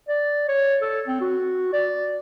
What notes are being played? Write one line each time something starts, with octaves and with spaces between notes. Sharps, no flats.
D5
C#5
A4
C4
F#4
D5